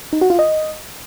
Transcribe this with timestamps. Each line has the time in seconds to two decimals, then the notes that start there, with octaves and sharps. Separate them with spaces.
0.13 D#4
0.21 F#4
0.30 F4
0.39 D#5